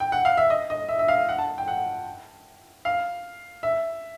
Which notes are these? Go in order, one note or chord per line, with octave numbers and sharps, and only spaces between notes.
G5
F#5
F5
E5
D#5
D#5
E5
E5
F5
F#5
A5
G5
F#5
F5
E5